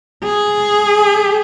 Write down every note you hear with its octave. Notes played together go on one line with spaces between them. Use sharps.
G#4